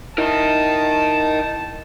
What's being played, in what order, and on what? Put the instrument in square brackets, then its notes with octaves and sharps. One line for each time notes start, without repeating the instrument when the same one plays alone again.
[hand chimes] E4 [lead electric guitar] A#4 D#5 [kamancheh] A5